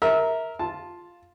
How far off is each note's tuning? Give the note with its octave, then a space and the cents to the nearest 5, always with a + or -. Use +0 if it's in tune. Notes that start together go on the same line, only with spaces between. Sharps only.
A#4 +0 E5 -25
F4 +0 A5 +0